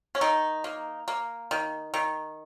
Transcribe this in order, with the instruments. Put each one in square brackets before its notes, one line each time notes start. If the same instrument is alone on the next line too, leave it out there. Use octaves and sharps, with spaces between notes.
[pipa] C#4
D#3 D#4
A#3
A#3
D#3
D#3